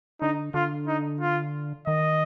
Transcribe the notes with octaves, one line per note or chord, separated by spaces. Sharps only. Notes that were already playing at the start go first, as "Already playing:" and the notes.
D3 D#4
D3 F4
D#4
F4
D#3 D#5